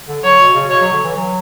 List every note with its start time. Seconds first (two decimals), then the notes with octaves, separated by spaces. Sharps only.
0.08 D3
0.24 F#3 C#5
0.39 B2
0.54 C#3
0.69 B2 C#5
0.81 F#3
0.92 D3
1.04 E3
1.16 F#3